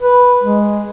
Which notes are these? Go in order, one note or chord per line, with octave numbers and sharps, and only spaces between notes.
B4
G#3